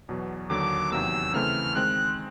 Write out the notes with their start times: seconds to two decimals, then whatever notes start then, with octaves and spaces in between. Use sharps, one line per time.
0.09 E2 B2 F#3
0.50 D#2 D3 F#3 D6
0.92 E2 C3 D#3 F#3 A#3 E6
1.34 C#3 E3 A3 C4 F6
1.75 D#3 G#3 C4 F#6